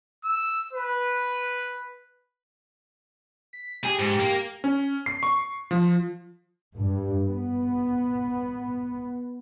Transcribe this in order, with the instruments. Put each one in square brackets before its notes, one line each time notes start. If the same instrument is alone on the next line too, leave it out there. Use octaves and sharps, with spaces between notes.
[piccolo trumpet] E6
B4
[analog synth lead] B6
[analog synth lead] G4 [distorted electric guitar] G#4
[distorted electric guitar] G#2
A#3
[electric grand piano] C#4
C7
C#6
F3
[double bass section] G2
B3